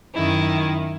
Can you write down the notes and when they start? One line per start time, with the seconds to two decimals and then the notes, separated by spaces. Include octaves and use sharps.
0.15 F#2 D#3 E4